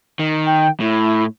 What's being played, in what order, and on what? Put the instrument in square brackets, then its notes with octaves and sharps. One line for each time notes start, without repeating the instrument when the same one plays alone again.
[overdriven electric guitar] D#3
[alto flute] G5
[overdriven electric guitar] A2 [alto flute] E4